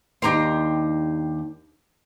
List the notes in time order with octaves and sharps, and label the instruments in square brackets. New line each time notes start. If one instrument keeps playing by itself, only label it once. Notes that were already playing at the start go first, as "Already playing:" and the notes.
[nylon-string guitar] D#2 D4 D#4 [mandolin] G4 A#5 C6